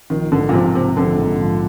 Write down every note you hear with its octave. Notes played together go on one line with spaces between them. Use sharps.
A#1 D#3
G#2 D3
A#2
C3 F3
C3 C4
A#1 D3
G#2
F3